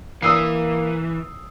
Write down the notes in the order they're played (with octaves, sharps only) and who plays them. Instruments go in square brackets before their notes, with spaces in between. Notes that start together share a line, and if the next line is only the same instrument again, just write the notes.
[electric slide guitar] E3 [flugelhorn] A#3 [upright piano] D#6 E6 C7